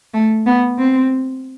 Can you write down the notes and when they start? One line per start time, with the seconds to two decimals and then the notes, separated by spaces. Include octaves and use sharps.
0.14 A3
0.46 B3
0.78 C4